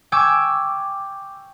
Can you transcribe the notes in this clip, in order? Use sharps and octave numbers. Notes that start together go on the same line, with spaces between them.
G5 G#5 C#6 D6 E6 G#6